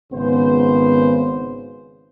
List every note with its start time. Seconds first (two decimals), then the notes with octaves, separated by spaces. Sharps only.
0.12 G#1 C#3 B3 C5